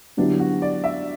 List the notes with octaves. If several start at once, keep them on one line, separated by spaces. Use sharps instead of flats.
D3 F#3 B3 D4 E4 G4
F#4
D5
E5